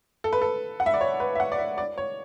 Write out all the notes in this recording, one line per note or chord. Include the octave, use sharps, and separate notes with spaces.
A4
B4
A4
F#5
E5
D5
C#5
B4
E5
F#5
D5
E5
D5
C#5